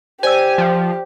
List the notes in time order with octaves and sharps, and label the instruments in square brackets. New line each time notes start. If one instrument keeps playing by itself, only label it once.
[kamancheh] G4 [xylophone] C5 D5 E6 [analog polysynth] G#5
[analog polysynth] F3